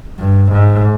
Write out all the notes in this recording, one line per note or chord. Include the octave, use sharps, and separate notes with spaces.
G2
G#2